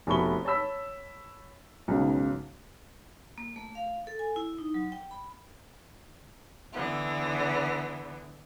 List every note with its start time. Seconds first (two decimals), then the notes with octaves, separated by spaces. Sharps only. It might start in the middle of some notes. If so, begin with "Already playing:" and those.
0.07 F1 B2 A3 B5 C#6 G7
0.45 C#5 A5 B5 E6 B6
1.88 B1 G#2 C#3
3.38 A#3
3.56 A3
3.75 F5
4.07 A4
4.19 G#5
4.36 E4
4.58 D#4
4.74 F#3
4.92 G5
5.11 B5
6.72 D3 E3 B3